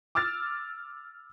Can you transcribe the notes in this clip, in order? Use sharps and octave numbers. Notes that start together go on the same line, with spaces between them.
D6 E6 F6 A6